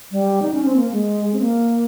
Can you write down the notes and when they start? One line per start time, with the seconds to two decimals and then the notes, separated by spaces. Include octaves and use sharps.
0.12 G3
0.42 D#4
0.54 C#4
0.65 C4
0.76 A#3
0.92 G#3
1.33 C4
1.40 A#3